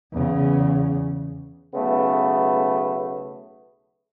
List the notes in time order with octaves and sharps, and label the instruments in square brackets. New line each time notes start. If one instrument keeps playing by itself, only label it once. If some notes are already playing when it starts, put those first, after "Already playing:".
[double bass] E2 C#3
[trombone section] B1 C#3 A3 B3